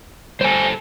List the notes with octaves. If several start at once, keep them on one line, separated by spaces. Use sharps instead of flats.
G3 A4 C5 G#5